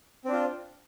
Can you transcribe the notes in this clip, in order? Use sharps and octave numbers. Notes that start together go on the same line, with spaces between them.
C4 D4 F4